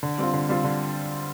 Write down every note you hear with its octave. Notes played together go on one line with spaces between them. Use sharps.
D3
G3 C4 F4
D3
G3 C4 F4
D3